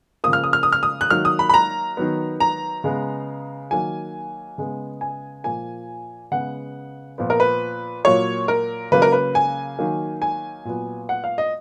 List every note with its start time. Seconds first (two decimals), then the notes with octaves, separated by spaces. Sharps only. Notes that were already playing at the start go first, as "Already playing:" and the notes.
0.24 C#3 F3 A#3 D#6
0.33 F6
0.44 D#6
0.53 F6
0.63 D#6
0.73 F6
0.83 D#6
1.01 F#6
1.10 D#3 F#3 A#3 F6
1.25 D#6
1.39 B5
1.49 B5
1.54 A#5
1.97 D#3 F#3 B3
2.40 A#5
2.84 C#3 G#3 B3
3.71 D#3 F#3 A#3 G#5
4.58 C#3 G#3 B3
5.01 G#5
5.44 A#2 F3 A#3 G#5
6.32 C#3 G#3 B3 F#5
7.18 A#2 F3 B3
7.30 A#4
7.40 B4
8.05 A#2 F#3 A#3 C#5
8.48 A#4
8.92 C#3 F#3 A#3 B4
9.02 A#4
9.12 B4
9.35 G#5
9.79 D#3 F#3 A#3
10.22 G#5
10.65 A#2 F#3 B3
11.09 F#5
11.24 F5
11.38 D#5